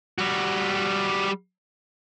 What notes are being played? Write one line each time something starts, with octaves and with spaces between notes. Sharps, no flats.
G3 F#4